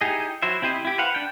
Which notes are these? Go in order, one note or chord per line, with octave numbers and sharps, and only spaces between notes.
D#4 E4 G4 G#4 D#5
F#3 E4 F#4 C5 E5
C4 E4 G4 C5 D#5
E4 G4
B4 C5 F5 F#5
D4 G5